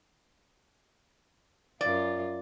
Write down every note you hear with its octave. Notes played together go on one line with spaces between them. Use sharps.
F#2 F4 D5